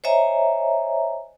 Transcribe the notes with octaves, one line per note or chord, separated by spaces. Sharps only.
C5 C#5 D#5 E5 G#5 A#5